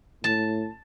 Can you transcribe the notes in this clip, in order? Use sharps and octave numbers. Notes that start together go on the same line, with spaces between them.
A2 A5